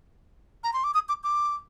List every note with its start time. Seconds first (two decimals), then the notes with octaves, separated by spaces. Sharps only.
0.64 A#5
0.73 C6
0.84 D6
0.94 D#6
1.09 D6
1.24 D6